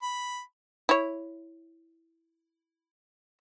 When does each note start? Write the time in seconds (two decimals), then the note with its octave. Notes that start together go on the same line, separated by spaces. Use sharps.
0.03 B5
0.89 E4 C#5